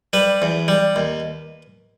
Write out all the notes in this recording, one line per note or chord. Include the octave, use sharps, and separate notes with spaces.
G3 B4
E2
G3
D#2